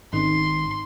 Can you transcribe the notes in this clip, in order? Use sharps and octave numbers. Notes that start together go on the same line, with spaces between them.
G#1 D#3 C#4 D#4 C6